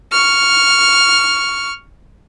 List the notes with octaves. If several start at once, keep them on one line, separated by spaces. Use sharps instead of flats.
C#6 F6